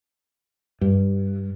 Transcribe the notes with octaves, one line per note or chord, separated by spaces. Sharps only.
G2